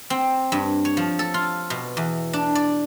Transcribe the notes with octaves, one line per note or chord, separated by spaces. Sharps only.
C4
G2
C#5
F3
A4
F4
B2
E2
D4
D5